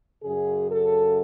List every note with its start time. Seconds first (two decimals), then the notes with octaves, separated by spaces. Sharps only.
0.23 F#2 C#3 G#4
0.69 A4